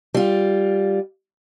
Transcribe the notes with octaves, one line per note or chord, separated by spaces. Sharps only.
G3 F4